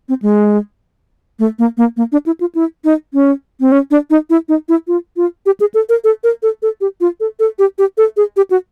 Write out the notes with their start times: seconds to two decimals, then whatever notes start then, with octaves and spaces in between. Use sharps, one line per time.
0.09 C4
0.22 G#3
1.39 A3
1.59 A#3
1.77 A#3
1.97 A#3
2.12 D4
2.26 E4
2.40 F4
2.55 E4
2.84 D#4
3.14 C#4
3.61 C4
3.72 C#4
3.91 D4
4.10 D#4
4.30 E4
4.49 D#4
4.69 E4
4.88 F4
5.17 F4
5.46 G4
5.60 G#4
5.74 A4
5.89 A#4
6.04 A4
6.24 A#4
6.43 A4
6.62 A4
6.81 G4
7.01 F4
7.20 A4
7.40 A4
7.59 G4
7.79 G4
7.98 A4
8.17 G#4
8.37 G4
8.51 F#4